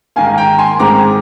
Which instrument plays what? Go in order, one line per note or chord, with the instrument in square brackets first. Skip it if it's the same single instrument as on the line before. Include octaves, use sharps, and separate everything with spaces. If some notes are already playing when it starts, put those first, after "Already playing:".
[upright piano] G#2 D#3 A#3 F5 G#5
G5 A#5
G#5 C6
G#2 D#3 G#3 C4 A#5 D6